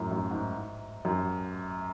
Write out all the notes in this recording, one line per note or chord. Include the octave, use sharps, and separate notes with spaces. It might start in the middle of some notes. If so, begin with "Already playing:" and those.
Already playing: F#2 A2
F#2
G#2
F#2